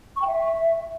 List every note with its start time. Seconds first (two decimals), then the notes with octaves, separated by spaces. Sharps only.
0.16 C#6
0.22 G5
0.27 E5